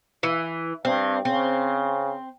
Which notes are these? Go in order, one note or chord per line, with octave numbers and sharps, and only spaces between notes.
E3
G2 C4
C#3 C4